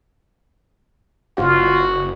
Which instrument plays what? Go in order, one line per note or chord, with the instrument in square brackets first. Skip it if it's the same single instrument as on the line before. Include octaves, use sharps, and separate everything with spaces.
[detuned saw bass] F#1 [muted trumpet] F4 [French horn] F#4